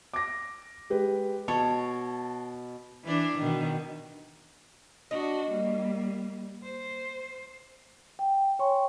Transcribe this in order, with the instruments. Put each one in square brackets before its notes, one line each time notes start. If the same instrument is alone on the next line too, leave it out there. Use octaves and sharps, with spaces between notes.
[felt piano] D6 A#6
G#3 G4 B4
[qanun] B2 C#5 [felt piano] A5
[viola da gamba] E3 D4
B2 D#3
[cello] D4 F#4 [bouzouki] D#5
[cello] G3 A#3
C5
[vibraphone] G5
C#5 G5 G#5 C6 C#6